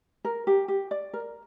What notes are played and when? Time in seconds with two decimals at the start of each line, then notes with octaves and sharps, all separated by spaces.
0.25 A#4
0.47 G4
0.68 G4
0.91 D5
1.13 A#4